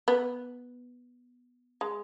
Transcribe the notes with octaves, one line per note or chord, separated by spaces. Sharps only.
B3
G#3